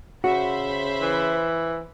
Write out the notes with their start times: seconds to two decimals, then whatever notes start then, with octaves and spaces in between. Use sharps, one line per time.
0.24 C#3 F#4 C5 E5 B5
1.01 E3